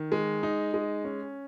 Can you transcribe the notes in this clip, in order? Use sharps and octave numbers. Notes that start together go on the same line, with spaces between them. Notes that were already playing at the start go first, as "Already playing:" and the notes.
Already playing: D#3
G#3
D#4
G#3
C#4